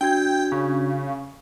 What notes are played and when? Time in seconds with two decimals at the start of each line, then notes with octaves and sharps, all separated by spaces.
0.01 D4 F#4 G5 G#6
0.52 C#3